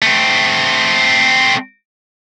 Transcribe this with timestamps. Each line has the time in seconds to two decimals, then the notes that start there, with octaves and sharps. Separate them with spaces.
0.02 A3 C4